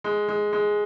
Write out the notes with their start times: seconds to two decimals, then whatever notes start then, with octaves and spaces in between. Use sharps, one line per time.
0.04 G#3
0.28 G#3
0.53 G#3